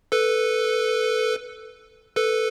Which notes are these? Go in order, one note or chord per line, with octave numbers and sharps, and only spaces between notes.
A4 B4
A4 B4